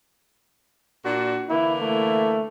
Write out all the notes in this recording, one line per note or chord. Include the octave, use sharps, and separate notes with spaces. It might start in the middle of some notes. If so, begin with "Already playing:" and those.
A#2 D4 F#4
D3 E3 A#3 E4
A3